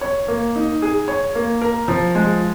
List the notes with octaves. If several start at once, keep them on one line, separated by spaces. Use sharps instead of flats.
C#5
A#3
D#4
G#4
C#5
A#3
A#4
F3
G#3